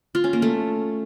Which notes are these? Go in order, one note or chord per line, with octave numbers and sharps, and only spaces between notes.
F4
C#4
A#3
A3